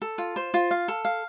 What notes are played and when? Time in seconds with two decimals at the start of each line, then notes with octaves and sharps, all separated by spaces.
0.02 A4
0.18 F4
0.36 C5
0.54 F4
0.71 F5
0.88 A4
1.05 F5